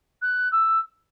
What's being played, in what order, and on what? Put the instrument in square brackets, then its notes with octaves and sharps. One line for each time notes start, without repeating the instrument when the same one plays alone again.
[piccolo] F#6
E6